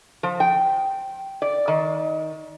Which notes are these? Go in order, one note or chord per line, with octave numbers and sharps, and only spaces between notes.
F3
G5
D5
D#3